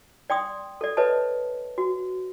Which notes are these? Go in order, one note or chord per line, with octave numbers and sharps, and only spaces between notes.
D5 G5 C6 D#6
A4 D5
B4 C#5 D#5 A5
F#4